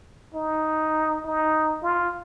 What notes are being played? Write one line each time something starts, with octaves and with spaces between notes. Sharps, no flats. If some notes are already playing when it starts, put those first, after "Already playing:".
D#4
D#4
F4